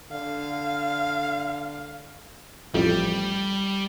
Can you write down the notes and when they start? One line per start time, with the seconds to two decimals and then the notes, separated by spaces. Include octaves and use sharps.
0.12 D3 F5
2.74 A1 F2 G3